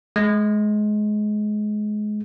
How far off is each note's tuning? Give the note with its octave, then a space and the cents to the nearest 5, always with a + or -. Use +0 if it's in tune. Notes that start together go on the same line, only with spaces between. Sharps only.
G#3 +25